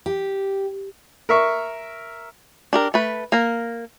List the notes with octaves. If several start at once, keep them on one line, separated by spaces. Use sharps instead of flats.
G4
A#4 E5 C#6
D4 G4 A#4
A3 B4
A#3 A#4